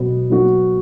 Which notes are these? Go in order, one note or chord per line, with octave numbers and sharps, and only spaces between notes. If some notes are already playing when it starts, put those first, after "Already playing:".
Already playing: B2 F#3 B3
F#3 B3 F#4